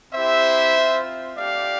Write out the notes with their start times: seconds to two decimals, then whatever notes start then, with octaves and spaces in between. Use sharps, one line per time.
0.12 C4 E4 G4 C5 E5
0.75 C4 F4
1.37 A3 D4 G4 D5 F5